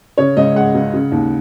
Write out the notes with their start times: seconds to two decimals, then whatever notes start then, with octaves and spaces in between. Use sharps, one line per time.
0.18 C#3 C#5
0.37 C#2 D#5
0.55 G#3 F#5
0.75 C#2
0.94 C#3
1.12 D#2